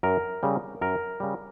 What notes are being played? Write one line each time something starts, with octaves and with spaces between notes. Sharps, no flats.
F#2 A#4
C#3 G3
F#2 A#4
C#3 G3